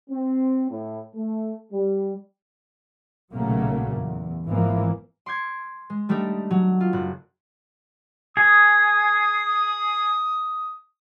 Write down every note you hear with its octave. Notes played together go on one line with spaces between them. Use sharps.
C4
A2
A3
G3
B1 A#2 C#3 F#3 A3 A#3
E2
G#1 G#2 E3 F3 A#3
C6 D6 G6 G#6 C#7
G#3
G3 A3 D4 D#4 G4
F#3
F4
F#1 F#6
G#4 D#6